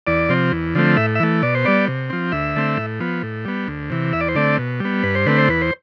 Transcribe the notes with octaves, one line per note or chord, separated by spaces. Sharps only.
E2 D5
C3 F3 C4
E2
D3 F3 A3 C4
A2 E5
E5
E3 A3
B2 D5
C5
G3 B3 D5
C3
F3 C4
D2 E5
D3 A3 C4
A2
F3 B3
A2
G3 B3
D2
C3 E3
E2 E5
D5
C5
D3 A3 C4 D5
B2
G3 B3
G2 B4
C5
D3 A3 C4 B4
C5
E2 B4
C5